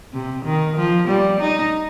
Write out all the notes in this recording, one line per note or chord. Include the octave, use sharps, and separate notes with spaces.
C3
D#3
F3
G3
D#4